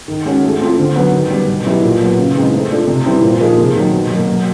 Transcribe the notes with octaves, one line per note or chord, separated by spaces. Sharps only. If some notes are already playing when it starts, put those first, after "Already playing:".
D#3
G#3 C#4 F#4
A3
C4 F4
D3
F#3 B3
D#3
G3 B3
B2
F#3 B3 E4 G4
A#2
F#3 B3
C#3
E3 G#3 C4 D#4
A3
D4 F4 A4
C3
E3 G3 C4 E4
A#2
F3 A#3 D#4 G#4
C3
D#3 F#3
B2
F#3 A#3
F#3